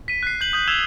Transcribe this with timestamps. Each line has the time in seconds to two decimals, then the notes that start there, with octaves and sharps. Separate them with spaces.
0.08 B6 D#7
0.23 F#6 C7
0.41 G6 F#7
0.53 D#6 G6
0.68 E6 G#6 E7 F7 G7